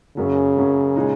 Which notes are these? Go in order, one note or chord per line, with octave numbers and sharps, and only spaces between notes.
F#1 F#2 C#3 F#3 C#4
F#1 F#2 F#3 C#4
A#2 G#3 D#4 G#4